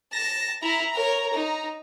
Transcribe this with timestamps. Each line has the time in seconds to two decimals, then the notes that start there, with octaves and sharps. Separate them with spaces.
0.13 A5 A#6
0.62 E4 A#5
0.95 A#4 C#5
1.34 D#4